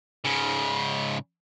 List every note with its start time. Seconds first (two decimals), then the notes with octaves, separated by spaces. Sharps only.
0.25 G#2 C#3